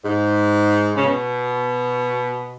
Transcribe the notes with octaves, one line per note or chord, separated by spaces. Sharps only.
G#2
C#3
B2